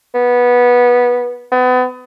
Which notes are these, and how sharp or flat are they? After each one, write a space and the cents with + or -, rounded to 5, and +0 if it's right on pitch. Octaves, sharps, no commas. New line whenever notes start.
B3 -15
B3 +35